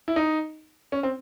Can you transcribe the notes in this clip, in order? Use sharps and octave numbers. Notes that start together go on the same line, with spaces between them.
E4
D#4
C#4
C4